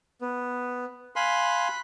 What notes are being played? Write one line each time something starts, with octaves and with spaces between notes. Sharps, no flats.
B3
F5 G#5 B5 C6 F#6